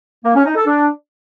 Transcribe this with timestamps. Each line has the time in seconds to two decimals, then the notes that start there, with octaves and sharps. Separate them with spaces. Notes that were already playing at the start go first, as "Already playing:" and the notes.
0.24 A#3
0.35 C#4
0.45 D#4
0.56 A4
0.66 D4